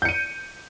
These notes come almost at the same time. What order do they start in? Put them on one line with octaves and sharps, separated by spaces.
G6 C#7 D#7